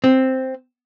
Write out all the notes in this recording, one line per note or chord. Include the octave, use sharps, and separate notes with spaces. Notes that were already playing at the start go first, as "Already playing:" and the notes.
C4